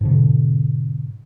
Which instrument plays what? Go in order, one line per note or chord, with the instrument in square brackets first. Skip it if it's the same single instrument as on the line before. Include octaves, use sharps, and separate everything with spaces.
[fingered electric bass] G#2 B2 D3